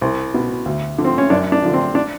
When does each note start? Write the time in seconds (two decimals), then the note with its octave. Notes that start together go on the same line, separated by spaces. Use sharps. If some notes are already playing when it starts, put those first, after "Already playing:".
0.01 C2
0.34 B2
0.66 D2
0.98 D3 F3
1.05 C4
1.18 C#4
1.30 F#2 D4
1.52 D4
1.62 D3 F3
1.73 C4
1.95 D4